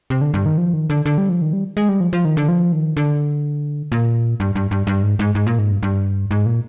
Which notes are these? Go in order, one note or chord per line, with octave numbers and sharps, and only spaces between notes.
C3
D3
G2
D#3
F3
D#3
D3
D3
G3
F3
D#3
G3
G#3
G3
F3
F3
D#3
D3
F3
D#3
D3
A#2
G2
G2
G2
G2
G#2
G#2
G#2
A#2
G#2
G2
G2
G#2
A#2